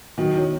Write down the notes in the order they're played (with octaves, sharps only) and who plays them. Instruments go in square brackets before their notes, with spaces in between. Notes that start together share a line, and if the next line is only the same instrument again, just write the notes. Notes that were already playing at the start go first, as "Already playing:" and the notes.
[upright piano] B2 D#3 [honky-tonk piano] F#3
[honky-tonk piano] C#4 E4